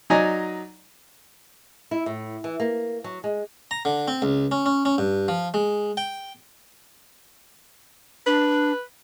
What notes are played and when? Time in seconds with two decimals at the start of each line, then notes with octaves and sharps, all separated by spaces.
0.10 F#3 D#4 D5 D#5 G#5 A#5
1.91 E4
2.06 A2
2.44 E3
2.60 A#3
3.04 F#3
3.24 G#3
3.71 A#5
3.85 D3
4.08 C4
4.22 C#2
4.51 C#4
4.66 C#4
4.85 C#4
4.98 G2
5.28 F3
5.54 G#3
5.97 G5
8.26 D4 B4